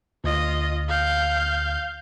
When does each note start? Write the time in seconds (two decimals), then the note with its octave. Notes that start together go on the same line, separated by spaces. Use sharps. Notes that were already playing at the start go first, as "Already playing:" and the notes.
0.24 D2 F4 D#5
0.89 F5 G6